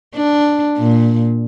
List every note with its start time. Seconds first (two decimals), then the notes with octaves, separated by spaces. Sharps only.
0.15 D4
0.77 A#2